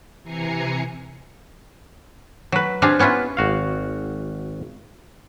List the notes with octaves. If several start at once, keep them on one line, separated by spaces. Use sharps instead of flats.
C3 E3 G#5 A#5 C7 C#7
F#3 B4
C4 D4 G4 G#4 F5 G#5
B3 C#4 E4 F4 B4
G#1 F#4 F5